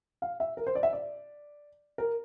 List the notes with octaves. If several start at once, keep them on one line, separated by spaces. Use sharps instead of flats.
F5
E5
A#4
C5
D5
E5
D5
A#4